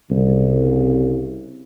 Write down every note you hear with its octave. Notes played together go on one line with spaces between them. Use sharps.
C2 C#3